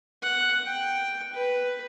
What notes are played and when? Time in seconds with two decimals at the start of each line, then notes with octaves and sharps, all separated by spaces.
0.22 F#5
0.66 G5
1.33 B4